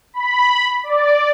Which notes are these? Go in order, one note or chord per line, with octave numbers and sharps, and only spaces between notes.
B5
D5